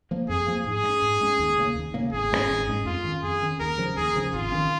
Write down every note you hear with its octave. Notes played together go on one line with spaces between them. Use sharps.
F3 A#3
F2 G#4
F3 A#3
G#2 G#4
G#3
C#4
G#2
G#3 C#4
D#2
C#3 A#3
D#2
C#3 A#3
G#1 G#4
G#2 G#3 C#4
G#1
G#2 G#3 C#4
F2 F4
D#3 C#4
F2 G#4
D#3 C#4
D#2 A#4
C#3 F3 C#4
D#2 G#4
C#3 F3 C#4
G#1 F4
D#3 C#4